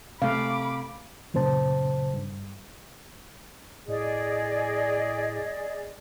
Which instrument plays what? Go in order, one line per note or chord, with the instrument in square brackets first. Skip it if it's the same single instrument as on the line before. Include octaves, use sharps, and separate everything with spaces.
[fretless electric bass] C3 A3 [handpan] F5 [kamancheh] B5 D6
[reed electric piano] F#2 A#2 C#3 C5 A5
G2
[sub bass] A2 [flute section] G#4 D5 D#5